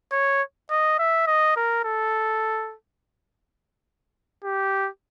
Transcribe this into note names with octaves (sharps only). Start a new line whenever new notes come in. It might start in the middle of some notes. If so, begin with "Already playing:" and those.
C#5
D#5
E5
D#5
A#4
A4
G4